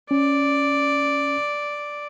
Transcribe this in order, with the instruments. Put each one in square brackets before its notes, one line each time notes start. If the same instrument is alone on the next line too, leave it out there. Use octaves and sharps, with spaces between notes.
[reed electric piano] C#4 [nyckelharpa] D5